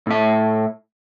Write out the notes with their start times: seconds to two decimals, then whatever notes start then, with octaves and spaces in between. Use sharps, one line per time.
0.07 A2 E5